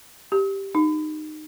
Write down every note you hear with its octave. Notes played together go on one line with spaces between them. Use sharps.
G4
D#4